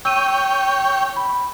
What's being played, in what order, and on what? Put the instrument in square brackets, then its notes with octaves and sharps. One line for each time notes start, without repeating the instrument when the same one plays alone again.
[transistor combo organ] C#5 G5 [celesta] E6 D#7
[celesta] B5